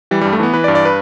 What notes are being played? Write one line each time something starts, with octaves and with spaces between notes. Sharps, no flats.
E3 G3
G2 G3
A3
E3 B3
E3 B4
D5
G2
D5
B4